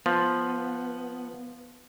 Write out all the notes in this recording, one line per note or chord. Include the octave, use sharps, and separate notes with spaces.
F3 B3